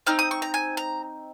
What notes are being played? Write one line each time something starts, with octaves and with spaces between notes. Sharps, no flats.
C4 D#4 F6
D#6
C#6
A#5
G#5
A#5